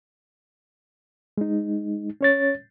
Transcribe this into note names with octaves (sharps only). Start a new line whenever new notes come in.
G#3 D#4
C#4 C#5 A6